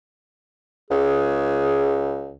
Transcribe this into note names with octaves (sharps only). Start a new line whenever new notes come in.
C#2 G#4